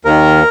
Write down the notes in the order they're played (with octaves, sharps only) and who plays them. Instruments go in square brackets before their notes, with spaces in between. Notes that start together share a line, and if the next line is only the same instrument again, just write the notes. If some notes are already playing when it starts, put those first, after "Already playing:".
[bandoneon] D#2 D#3 A#4